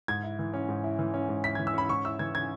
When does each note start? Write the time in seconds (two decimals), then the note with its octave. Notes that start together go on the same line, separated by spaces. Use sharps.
0.08 G#2 G#6
0.23 E4
0.39 E3
0.54 C#4
0.69 G#2
0.84 E4
0.99 E3
1.14 C#4
1.29 G#2
1.44 E4 B6
1.55 E3 G#6
1.67 E6
1.74 C#4 B5
1.89 G#2 C#6
2.05 E4 E6
2.19 E3 G#6
2.34 C#4 G#6